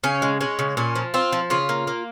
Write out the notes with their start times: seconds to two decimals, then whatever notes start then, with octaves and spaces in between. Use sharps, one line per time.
0.03 C#3 C#4
0.22 G#3
0.41 G#3 C#4
0.59 C#3
0.77 A#2 C#4
0.95 F3
1.14 C4 F4
1.32 F3
1.50 C#3 F4
1.69 A#3
1.87 A#3